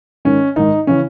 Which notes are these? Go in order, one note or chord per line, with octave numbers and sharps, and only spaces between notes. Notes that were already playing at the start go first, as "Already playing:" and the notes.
G#2 D#3 C#4
G#2 D#3 D#4
C#3 E3 C#4